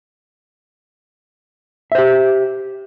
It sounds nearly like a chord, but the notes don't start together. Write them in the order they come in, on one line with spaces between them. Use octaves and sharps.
E5 C5 G4